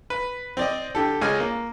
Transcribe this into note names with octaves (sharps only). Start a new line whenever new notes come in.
B4
C4 D5 D#5
D3 G4 A4
C#2 G#3 G#5 F6
A#3